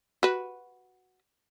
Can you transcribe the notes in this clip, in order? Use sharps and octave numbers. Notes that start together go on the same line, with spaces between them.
F#4 B4